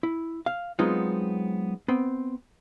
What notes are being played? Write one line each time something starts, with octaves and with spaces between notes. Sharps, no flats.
E4
F5
F#3 G#3 B3 C4 D#4 F4
B3 C4